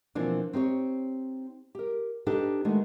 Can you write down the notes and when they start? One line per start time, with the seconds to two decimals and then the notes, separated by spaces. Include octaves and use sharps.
0.15 B2 E3 F3 A#3 C4 D4
0.53 C4 D#4 G4 C#5
1.75 G4 A#4
2.26 D4 D#4 G4 A4 B4
2.65 D#3 G#3 A3 B3